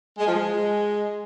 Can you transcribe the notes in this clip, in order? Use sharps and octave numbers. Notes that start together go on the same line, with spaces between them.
G#3
F3
G#3